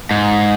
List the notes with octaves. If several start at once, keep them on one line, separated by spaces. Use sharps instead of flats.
G#2